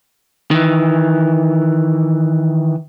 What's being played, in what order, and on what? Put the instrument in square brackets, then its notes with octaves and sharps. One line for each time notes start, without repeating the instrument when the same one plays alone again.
[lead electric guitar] D#3 E3